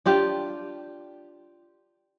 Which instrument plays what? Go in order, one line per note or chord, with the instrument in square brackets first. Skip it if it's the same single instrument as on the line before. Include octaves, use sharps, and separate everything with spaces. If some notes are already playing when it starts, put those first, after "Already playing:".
[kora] D4 F4 G4